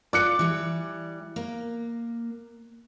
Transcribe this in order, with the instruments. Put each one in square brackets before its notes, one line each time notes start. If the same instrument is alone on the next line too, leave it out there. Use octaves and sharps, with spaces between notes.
[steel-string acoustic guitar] F4 D5 [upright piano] D6 F#6 C#7
[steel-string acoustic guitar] E3 G3
A#3